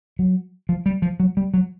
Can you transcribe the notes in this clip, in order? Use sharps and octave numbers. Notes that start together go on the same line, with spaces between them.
F#3
F3
G3
F3
F#3
G3
F#3